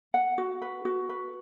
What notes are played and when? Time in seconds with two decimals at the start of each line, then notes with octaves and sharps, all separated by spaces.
0.14 F#5
0.38 F#4
0.62 B4
0.85 F#4
1.09 B4